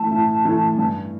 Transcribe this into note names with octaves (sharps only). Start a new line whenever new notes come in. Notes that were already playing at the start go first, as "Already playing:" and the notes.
Already playing: E3 A3 A5
A2
E3 A3
G2